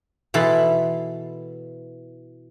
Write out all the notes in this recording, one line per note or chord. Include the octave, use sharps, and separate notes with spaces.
B2 E3 A4 B5 C6